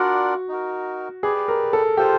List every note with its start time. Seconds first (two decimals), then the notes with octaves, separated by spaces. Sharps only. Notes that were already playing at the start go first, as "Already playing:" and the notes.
Already playing: D4 F4 F#4 A#4 D5 F#5
0.49 D#4 F#4 A#4
1.23 G4 G#4 B4 D5
1.48 A#4
1.73 A4
1.97 F4 G4 A4 C5